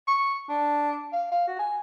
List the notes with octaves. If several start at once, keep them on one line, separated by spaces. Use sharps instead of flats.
C#6
D4
F5
F5
F#4
G#5